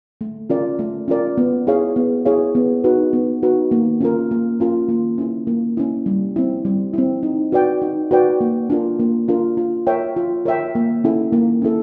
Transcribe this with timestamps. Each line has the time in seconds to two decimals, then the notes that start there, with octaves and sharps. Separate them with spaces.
0.21 A3
0.50 C#4 F4 A#4 D5
0.79 A3
1.08 C#4 F4 A#4 D5
1.38 B3
1.67 E4 G#4 C#5 F5
1.96 B3
2.25 E4 G#4 C#5 F5
2.55 B3
2.84 D#4 F#4 B4
3.13 B3
3.43 D#4 F#4 B4
3.71 A#3
4.01 C#4 F4 A#4
4.31 A#3
4.60 C#4 F4 A#4
4.89 A#3
5.18 C#4 E4
5.47 A#3
5.77 C#4 E4
6.06 G3
6.36 C4 E4
6.65 G3
6.93 C4 E4
7.23 D#4
7.52 F#4 B4 D5 G5
7.82 D#4
8.11 F#4 B4 D5 G5
8.41 A#3
8.70 D4 F4 A#4
9.00 A#3
9.28 D4 F4 A#4
9.57 F4
9.87 A#4 C#5 E5 G5
10.16 F4
10.45 A#4 C#5 E5 G5
10.75 A#3
11.04 C#4 E4 A4
11.33 A#3
11.62 C#4 E4 A4